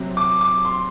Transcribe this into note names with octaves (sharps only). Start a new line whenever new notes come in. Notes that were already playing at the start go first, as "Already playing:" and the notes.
Already playing: C3 F#3 C4
D6
D6
C6